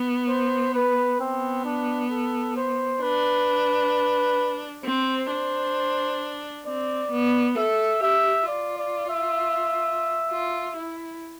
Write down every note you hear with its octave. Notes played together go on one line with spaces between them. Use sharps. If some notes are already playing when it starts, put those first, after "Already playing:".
Already playing: B3
C5
B4
B3 C4
D4
A4
C5
D4 B4
C4 C5
D4
C4 D5
B3
A4 E5
G4 E5
F4 D5
D5
E5
F4
E4